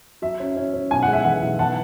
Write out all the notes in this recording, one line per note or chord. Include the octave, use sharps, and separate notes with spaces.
F#3 E5
C#4
C#4
C#4
B1 G#5
F#5
G#3
E5
E3 F#5
B1
E3 F#5 A5